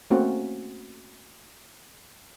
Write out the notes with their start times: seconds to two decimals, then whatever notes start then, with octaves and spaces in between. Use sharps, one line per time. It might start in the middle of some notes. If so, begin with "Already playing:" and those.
0.10 A3 A#3 C4 C#4 F#4